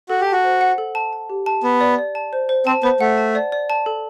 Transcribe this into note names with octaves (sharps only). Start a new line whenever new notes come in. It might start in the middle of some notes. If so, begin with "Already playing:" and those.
F#4 A4
G4
A5
F#4
C5
F#5
A4
A5
A5
G4
A5
B3 A5
D5
D5
A5
C5
C5
C4 A5
B3 C5
A3 F#5
A5
D5
D5
A5
A4